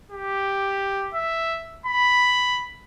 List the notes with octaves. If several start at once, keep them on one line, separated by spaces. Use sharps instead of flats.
G4
E5
B5